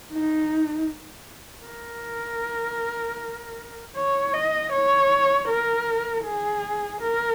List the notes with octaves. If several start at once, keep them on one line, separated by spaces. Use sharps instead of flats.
D#4
A#4
C#5
D#5
C#5
A#4
G#4
A#4